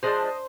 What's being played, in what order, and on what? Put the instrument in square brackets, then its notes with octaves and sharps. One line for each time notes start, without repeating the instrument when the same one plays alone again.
[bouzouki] F3 G#3 D4 C5 D#5